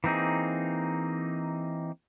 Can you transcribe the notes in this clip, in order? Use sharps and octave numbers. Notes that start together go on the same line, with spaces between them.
E3 A#3 C4 D#4 G#4